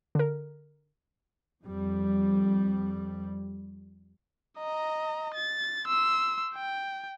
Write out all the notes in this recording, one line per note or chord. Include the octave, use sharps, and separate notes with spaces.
D3 A#4
F2 G3
D#5 A#5
A6
C6 E6
G5